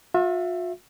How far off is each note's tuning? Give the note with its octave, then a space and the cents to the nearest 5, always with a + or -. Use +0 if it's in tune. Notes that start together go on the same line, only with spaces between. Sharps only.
F4 +45 E5 +15